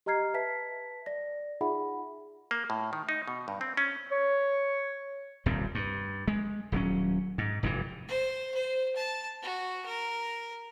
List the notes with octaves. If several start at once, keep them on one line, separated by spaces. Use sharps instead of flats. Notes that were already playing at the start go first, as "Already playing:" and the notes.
G4 D#5 A#5 F6 G#6 C7
B4 E5 A5 B6
D5 A#6
D#4 F4 G#4 E5 F#5 B5
A#3
A2
D#3
D#4
B2
G2
C4
C#4
C#5
D#1 C2 G2 C4
G2
G#3
D#1 F#3 C#4
G#2
F1 G2 C3 E3
C5
C5
A5
F#4
A#4